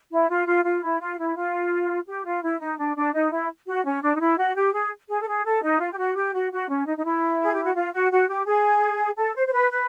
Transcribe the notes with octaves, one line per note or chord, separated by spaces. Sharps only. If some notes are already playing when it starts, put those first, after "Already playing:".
E4
F4
F4
F4
E4
F4
E4
F4
G4
F4
E4
D#4
D4
D4
D#4
E4
F#4
C#4
D4
D#4
E4
F#4
G4
G#4
G#4
A4
G#4
A4
D#4
F4
G4
F#4
G4
F#4
F#4
C#4
D#4
D#4
E4
G#4
G4
F#4
F4
F#4
F#4
G4
G#4
A4
C5
C5
B4
B4